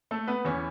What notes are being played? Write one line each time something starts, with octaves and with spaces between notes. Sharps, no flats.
A3 A4
B3 B4
E2 E3 C#4 C#5